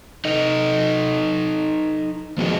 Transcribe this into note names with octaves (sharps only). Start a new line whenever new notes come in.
D#4 A4 D#5
F3 B3 F#4 G#4 D#5